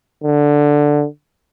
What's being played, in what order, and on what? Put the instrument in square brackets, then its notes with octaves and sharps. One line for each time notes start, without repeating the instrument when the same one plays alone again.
[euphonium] D3